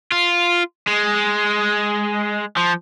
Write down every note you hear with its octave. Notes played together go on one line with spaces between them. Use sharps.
F4
G#3
F3